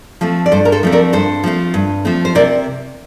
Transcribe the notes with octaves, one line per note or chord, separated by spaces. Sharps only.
F3 A3 C4
D5
G2 A4 C5
A#4
A4 C5
F3 A3 C4
A#4 D5
G2 A4 C5
F3 A3 C4
G2
F3 A3 C4
C5
C3 A#4 D5